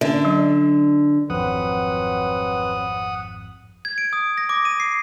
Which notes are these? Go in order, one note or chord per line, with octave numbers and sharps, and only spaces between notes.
D3 A#3 C#4 E5
F#3
G#1 F2 F#3 C4 B4 F#5 D#6
G#6
D7
D#6
A#6
D6
D#7
C7